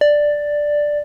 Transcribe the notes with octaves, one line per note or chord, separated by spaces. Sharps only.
D5